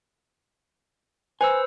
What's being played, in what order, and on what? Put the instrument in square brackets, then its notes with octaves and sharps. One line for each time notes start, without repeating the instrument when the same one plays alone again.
[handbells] B4 C5 E6 [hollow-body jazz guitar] G#5